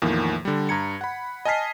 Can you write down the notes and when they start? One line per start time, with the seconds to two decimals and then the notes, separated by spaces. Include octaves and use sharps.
0.02 E2 A2 D#3 F3 A#3
0.45 D3 G3
0.69 G2 A#5 G#6 C#7
1.01 F#5 B5
1.45 D#5 G#5 A5 F6 B6 C7